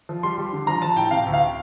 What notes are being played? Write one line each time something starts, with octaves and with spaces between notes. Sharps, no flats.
F3
G3 C6
G3
D3
F3 A#5
F3 A5
A2 G5
C3 F5
D2
F5